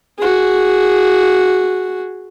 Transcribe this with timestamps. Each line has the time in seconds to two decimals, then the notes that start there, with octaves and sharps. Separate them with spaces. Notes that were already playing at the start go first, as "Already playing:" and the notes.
0.18 F#4 G#4